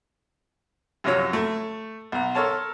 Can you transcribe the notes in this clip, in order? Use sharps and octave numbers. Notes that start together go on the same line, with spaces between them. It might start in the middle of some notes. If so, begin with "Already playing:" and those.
F#2 C3 F3 F#3 F4 C#5
A3
B1 A#5
A4 A#4 C#5 A5 C6